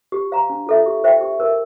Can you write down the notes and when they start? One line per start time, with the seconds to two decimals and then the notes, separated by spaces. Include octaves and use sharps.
0.12 G4
0.32 C5 F5 A#5
0.50 D4
0.67 F4 A4 E5
0.86 G4
1.04 C5 E5 G5
1.21 G4
1.40 A#4 E5